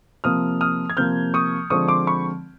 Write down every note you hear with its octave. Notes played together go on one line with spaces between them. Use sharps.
C3 F3 A#3 D#6 F6
D#6 F6
G#6
C3 F3 A#3 F6 G6
C#6 D#6
D3 F3 G#3 C4 C#6 D#6
C6 D6
B5 C#6